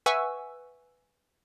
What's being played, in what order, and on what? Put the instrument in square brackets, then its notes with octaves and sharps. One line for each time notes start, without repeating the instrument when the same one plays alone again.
[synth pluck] B4 E5 F#5 G#5 C#6 E6